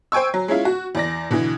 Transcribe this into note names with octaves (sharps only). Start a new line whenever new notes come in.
C5 G5 G#5 C#6 E6
F#3
G#3 C#4 E4 F4
F#4
E2 D5 A#6
B2 D3 E3